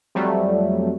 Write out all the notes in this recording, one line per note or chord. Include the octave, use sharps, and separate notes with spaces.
F2 F#3 G3 A3